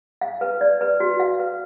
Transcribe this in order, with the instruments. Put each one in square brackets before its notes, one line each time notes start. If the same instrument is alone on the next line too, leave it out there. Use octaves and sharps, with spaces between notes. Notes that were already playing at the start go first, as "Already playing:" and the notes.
[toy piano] F5
B4
D5
B4
F#4
F5
B4